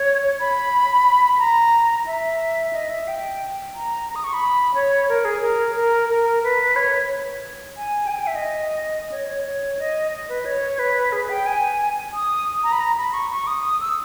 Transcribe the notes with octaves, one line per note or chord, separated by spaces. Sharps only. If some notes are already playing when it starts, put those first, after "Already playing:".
Already playing: C#5
B5
A#5
E5
D#5
E5
G5
A#5
A#5
D#6
C#6
B5
C#5
A#4
G#4
A#4
A#4
A#4
B4
C#5
G#5
G5
G#5
G5
E5
D#5
C#5
C#5
C#5
D#5
D#5
B4
C#5
B4
G#4
G5
G#5
D#6
A#5
B5
A#5
B5
C#6
C#6
D#6
E6